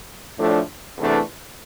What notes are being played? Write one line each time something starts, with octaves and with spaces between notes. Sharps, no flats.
A2 F3 A3 D4
E2 C3 E3 A3 D4